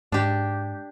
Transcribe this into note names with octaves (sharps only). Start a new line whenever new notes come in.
G#2 D4 G4